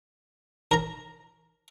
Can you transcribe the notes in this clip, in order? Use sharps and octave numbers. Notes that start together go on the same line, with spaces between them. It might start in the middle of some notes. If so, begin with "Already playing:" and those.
A#4 A#5